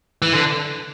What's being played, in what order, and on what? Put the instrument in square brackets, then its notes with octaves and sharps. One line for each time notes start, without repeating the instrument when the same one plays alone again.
[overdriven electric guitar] E3
D3